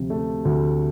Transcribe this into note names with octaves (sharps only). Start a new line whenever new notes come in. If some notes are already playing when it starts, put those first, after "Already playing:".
Already playing: D2 C3 F3
A3
D2